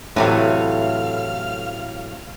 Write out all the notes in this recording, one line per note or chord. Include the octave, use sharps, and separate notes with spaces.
A2 C3 E3 F#3 A3 F5 F6